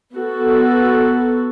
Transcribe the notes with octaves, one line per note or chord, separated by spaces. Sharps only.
B3 F#4 A4